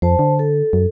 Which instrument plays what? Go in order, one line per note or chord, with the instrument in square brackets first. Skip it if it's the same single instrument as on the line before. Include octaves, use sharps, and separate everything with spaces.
[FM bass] F2 [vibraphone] C5 A5
[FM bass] D3
[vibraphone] A4
[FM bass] F#2